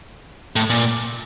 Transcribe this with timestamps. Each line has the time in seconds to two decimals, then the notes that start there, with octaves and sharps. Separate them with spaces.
0.56 A2
0.70 A#2